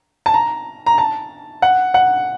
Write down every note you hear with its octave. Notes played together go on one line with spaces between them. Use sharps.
A5
A#5
A#5
A5
F#5
F#5